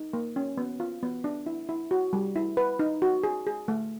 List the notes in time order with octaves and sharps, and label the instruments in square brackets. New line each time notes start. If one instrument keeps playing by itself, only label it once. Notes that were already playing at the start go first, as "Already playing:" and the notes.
Already playing: [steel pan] D#4
A#3
C#4
B3
F4
B3
D4
E4
E4
F#4
G3
E4
B4
D#4
F#4
G#4
G#4
A3